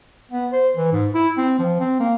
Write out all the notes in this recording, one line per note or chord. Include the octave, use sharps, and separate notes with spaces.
B3
C5
E3
G#2
E4
C4
F3
C4
A#3